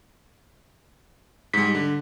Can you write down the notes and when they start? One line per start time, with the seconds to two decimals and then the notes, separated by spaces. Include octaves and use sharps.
1.53 G#2 G3 B6
1.75 D3